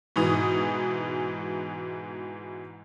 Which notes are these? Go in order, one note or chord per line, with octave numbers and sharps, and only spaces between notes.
G#2 B2 E3 D#6